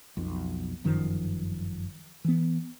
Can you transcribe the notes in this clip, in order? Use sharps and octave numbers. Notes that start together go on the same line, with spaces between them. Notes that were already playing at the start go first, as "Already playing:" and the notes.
B1 F2 B2
G1 F#2 D#3 F3
E3 B3